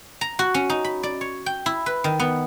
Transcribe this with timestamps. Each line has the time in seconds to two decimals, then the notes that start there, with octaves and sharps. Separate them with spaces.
0.21 A#5
0.39 F#4
0.54 C#4
0.70 D#4
0.84 B5
1.03 D5
1.21 C#5
1.46 G5
1.66 E4
1.86 B4
2.04 D#3
2.20 B3